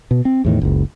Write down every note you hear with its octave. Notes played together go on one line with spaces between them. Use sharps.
B2
C4
E2 A2 D#3
F#1 C#2